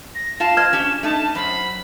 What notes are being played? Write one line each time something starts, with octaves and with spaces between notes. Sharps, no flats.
A#6
F4 F5 A5 E7
C5 D#5 F6 G#6
C#4 G4
A3 D#4 A5
F#2 C5 B5